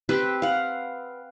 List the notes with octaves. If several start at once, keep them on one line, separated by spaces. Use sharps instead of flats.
C4 G4 B4
F5 F#5